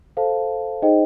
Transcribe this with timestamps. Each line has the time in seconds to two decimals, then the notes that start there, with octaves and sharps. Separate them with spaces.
0.17 A4 C5 F5 A5
0.82 D#4 G#4 C5 D#5 G5